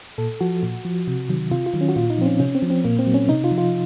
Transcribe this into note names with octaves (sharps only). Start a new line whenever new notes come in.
A#2 A4
F3 F#4
A#2
F3
C3
D#3 F#3
C3 F4
F4
D#3 F#3
C#4
F#4
A#2 F4
D#4
F3 C4
C#4
C3 C#4
C4
F3
C4
A#2 A#3
C4
F#3
C#4
C3 D#4
F4
F3
F4